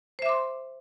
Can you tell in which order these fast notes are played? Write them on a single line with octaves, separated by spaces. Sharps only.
C5 E5 D6 C6